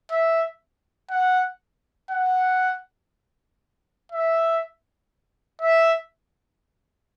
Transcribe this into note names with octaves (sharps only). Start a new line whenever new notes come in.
E5
F#5
F#5
E5
E5